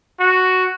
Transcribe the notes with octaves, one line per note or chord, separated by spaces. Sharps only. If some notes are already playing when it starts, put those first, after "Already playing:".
F#4